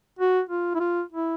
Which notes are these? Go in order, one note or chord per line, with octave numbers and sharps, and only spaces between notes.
F#4
F4
E4
F4
E4